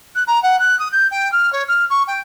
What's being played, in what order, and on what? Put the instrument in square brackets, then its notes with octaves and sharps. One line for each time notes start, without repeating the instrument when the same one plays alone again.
[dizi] F#6
A#5
F#5
F#6
D#6
G6
G5
F6
C#5
F6
C#6
G5